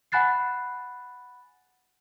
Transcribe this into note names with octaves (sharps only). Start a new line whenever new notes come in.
F#5 G#5 B5 F#6 A6 C7